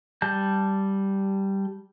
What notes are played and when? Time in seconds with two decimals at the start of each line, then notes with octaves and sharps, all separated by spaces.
0.22 G3 A5 G6